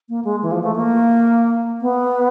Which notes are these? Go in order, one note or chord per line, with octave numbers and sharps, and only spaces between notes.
A#3
G#3
E3
F3
A3
A#3
B3